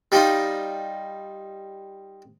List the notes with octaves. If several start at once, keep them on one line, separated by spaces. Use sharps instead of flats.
G3 D#4 F4